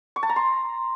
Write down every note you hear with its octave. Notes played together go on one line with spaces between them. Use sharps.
C#6
A5
A#5
C6